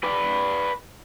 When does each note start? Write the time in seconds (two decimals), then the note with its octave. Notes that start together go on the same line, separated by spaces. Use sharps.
0.03 B4 D5